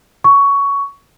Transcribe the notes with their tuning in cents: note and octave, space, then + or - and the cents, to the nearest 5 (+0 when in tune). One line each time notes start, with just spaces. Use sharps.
C#6 +15